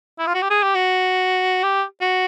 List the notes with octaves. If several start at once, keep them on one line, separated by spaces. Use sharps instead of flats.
E4
F4
F#4
G4
G#4
G4
F#4
G4
F#4